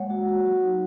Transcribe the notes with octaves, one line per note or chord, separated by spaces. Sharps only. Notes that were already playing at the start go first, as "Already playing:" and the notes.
Already playing: G#3 A#3 C#5 F#5
F#4
F#4
F#3
D#4